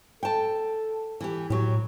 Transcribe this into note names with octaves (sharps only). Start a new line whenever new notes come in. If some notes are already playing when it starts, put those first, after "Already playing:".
A4 G5 A5
E3 G4
A2 F#3 G4